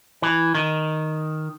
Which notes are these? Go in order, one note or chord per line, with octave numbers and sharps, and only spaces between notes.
E3
D#3